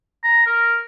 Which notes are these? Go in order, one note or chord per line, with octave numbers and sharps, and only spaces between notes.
A#5
A#4